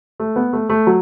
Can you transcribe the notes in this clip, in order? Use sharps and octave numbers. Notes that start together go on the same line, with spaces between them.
A3
B3
A3
A3
F#3